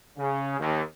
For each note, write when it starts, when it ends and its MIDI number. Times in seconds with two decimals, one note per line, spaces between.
0.18 0.57 49
0.60 0.81 39